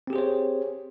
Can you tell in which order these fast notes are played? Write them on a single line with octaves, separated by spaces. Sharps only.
C4 G4 G#4 C5 C#5